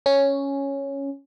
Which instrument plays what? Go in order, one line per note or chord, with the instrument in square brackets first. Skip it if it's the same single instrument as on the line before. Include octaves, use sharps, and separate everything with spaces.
[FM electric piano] C#4